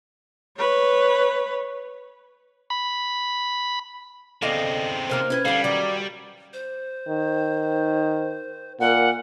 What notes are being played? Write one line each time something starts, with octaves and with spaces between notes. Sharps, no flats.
B4 C#5
B5
E2 C#3 C4 A4 D5 D#5 F5 A#6
C3 A#3 D#4 C5 F6
C#4 E4 B4 G#6
D3 G3 D4 F5
D#3 F#3 D5
C5
D#3
A#2 A#4 F#5